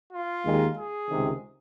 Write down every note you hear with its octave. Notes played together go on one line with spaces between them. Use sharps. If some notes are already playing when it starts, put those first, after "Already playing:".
F4
D#2 D#3 G#3
G#4
C#2 C3 D#3